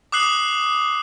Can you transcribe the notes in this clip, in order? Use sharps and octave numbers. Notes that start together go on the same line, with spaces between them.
D6 D#6 F#6 C7 F#7